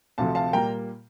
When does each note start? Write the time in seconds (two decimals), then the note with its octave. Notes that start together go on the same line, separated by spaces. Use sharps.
0.18 D2 C3 F3 A3 F5 A5
0.35 F5 A5
0.52 A#2 G3 A#3 G5 A#5